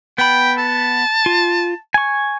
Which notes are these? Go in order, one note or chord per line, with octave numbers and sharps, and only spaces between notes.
B3 G5 B5
A5
F4
G#5 C#6